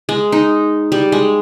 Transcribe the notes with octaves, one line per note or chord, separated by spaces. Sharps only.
G#3
D#4
G3
G#3